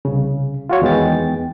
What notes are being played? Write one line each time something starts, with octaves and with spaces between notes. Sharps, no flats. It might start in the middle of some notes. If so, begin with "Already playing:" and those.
C2 C#3
F4 F#4 C#5
E2 D#3 G#3 B3 G5 A6